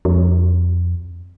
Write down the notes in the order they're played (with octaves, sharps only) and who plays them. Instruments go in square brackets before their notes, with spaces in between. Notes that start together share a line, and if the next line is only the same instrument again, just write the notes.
[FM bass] F2